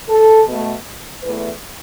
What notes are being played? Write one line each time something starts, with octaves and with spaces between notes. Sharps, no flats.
A4
B2 A3
E2 E3 A3 B4